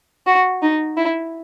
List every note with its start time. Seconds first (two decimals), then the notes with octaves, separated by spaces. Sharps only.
0.27 F#4
0.62 D#4
0.97 E4